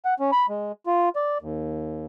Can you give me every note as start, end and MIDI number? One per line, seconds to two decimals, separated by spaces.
0.05 0.14 78
0.20 0.31 61
0.32 0.46 83
0.49 0.72 56
0.87 1.09 65
1.16 1.38 74
1.42 2.06 39